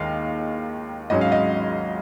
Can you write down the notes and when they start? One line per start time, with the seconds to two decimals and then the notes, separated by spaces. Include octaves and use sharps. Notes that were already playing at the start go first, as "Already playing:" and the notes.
Already playing: D#2 D#3 G#3 D#5 F5
1.10 G#1 G#2 F#3 C#4 D#5
1.21 F5
1.32 D#5